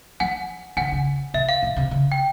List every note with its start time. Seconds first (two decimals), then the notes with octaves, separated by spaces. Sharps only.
0.20 F3 F#5 G#5
0.77 D3 F#5 G#5
0.92 C#3
1.34 C3 E5
1.49 F5
1.62 A#2
1.76 C3
1.91 C#3
2.12 G5